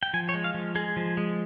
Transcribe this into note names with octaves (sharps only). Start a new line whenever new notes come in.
G5
F3 G#5
C#5
G#3
F5
F3
G#3 G#4
F3
G#3